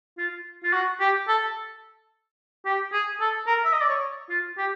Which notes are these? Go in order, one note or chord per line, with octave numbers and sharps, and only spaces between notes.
F4
F4
F#4
G4
A4
G4
G#4
A4
A#4
E5
D#5
D5
C#5
F4
G4